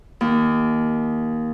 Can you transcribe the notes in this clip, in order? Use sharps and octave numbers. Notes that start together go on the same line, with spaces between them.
D#2